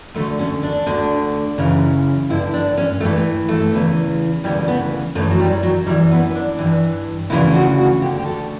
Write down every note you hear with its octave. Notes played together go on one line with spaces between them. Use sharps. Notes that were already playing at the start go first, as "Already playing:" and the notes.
D2 D3 A3
C#4
D4
D2 D3
F#2 C#3 E3
G2 D3 E4
D4
C#4
G2 E3 A3
A3
E2 C#3 E3
D2 C#3 E3 G3
B3
F#2 E3 A3
F#3
G3
F#3
F#2 E3 G3
B3
D4
G2 E3
D2 C#3 E3 E4
F#4
F#4
D2 D3 G4
G4
A4